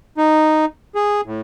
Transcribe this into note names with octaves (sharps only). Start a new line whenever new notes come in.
D#4
G#4
A2